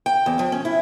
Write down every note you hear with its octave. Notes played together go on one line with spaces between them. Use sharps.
G5
E2
F3
C#4
E4